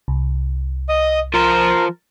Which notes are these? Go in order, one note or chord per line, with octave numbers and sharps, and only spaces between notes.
C2
D#5 D#6
F3 A#4 C5